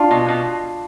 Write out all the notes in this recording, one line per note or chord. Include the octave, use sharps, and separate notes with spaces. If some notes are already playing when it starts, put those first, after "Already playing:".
Already playing: D4 F4
B2
B2